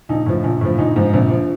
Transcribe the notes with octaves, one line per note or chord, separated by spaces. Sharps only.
A#1 D#4
A2 F3
A#1
A2 F3
A#1 D#4
G#2 F3
A#1 C4
F3